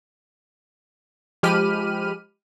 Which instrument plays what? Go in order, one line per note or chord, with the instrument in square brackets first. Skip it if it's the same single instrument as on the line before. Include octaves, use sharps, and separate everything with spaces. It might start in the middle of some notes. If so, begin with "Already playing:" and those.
[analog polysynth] F3 G#3 G4 B5 F6 D#7